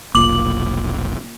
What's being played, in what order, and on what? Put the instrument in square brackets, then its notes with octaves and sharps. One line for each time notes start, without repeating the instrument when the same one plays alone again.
[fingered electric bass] F1 B1 [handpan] A#3 F4 [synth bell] D6 F#7